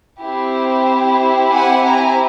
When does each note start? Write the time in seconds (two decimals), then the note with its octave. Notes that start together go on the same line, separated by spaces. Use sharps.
0.24 C4 E4 G4
1.52 F#5 G#5
1.83 G#5 A#5